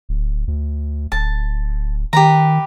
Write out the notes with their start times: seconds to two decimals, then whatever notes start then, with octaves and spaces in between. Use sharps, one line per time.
0.09 D1
0.47 D2
1.12 D1 A5
2.13 D#3 G4 B4 A#5